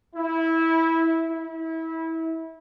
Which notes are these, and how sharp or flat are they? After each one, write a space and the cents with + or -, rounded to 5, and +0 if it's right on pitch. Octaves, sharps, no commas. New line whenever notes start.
E4 -15
E4 -25